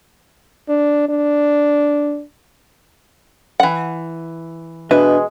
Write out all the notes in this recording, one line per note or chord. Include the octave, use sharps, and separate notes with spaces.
D4
D4
E3 F#5
B2 G#3 D4 B4 E5